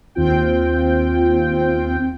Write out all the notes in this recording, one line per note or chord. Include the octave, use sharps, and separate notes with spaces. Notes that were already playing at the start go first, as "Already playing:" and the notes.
D#2 C4 F4 G5